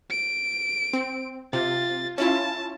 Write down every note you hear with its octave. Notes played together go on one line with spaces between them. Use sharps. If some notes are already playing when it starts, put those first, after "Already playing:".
D7
C4
C3 F4 A6
C#4 E4 F4 A5